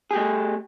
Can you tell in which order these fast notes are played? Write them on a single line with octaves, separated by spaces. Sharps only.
G#4 G4 A3